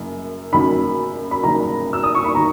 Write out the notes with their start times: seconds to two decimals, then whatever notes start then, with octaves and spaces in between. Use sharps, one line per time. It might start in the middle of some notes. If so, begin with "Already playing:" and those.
Already playing: F#1 F#2
0.52 F#1 F#2 D#3 B5
1.31 B5
1.43 F#1 F#2 D#3 A#5
1.93 E6
2.03 D#6
2.15 C#6
2.24 B5
2.35 D#3 A#5